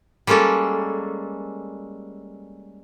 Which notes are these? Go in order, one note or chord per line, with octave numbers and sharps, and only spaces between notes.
G3 G#3 A#3 C#4 A4